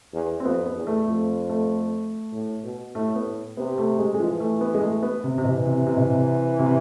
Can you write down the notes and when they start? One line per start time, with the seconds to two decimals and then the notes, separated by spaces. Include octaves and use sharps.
0.13 E2
0.40 C4
0.45 F2 B3
0.66 B3
0.76 E2
0.87 A3
1.07 F2 A3
1.50 A3
2.32 A2
2.64 B2
2.95 A2 A3
3.16 B3
3.57 C3 B3
3.78 A3
3.99 G#3
4.14 G#3
4.20 E3 F3
4.40 A3
4.61 B3
4.74 G#3
4.82 A3
5.03 B3
5.24 C3
5.38 C3
5.44 B2 E3
5.65 C3
5.87 C3
5.97 B2
6.06 C3
6.59 C3